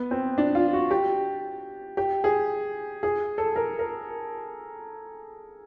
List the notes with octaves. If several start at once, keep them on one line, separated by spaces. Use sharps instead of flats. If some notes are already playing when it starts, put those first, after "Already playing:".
Already playing: B3
C4
D4
F4
F#4
G4
G4
G#4
G#4
A4
A#4
A#4